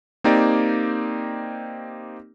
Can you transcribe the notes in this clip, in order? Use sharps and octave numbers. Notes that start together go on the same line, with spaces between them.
A#3 C4 D#4 G4 D5